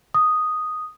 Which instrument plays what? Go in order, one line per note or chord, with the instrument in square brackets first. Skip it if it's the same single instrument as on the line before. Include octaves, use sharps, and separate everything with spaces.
[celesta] D#6